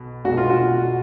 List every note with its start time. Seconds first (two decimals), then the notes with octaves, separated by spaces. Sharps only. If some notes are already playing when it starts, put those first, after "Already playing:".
Already playing: B1 B2
0.25 B1 B2 G#3 F#4
0.38 F4
0.50 F#4